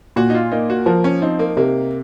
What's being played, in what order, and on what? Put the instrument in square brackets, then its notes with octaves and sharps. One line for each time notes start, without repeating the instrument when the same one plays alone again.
[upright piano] A#2 [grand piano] F#4
[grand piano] D#4
F4
[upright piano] A#3 [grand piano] D#4
[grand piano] F#4
[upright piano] F3 [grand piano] A#4
[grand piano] C#4
[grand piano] C4 [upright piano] D#4
[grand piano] A#3
[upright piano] C3 [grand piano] A#3